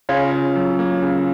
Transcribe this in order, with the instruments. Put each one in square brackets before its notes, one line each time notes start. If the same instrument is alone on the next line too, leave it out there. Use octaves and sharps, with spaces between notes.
[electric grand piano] C#3 [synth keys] C#4 F4
[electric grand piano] C#3
F#3
A#3
C#3